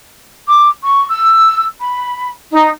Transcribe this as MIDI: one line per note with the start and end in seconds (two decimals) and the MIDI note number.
0.47 0.68 86
0.82 1.05 85
1.09 1.63 88
1.80 2.29 83
2.51 2.69 63